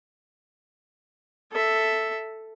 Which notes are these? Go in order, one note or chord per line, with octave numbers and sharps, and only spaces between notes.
A4 E5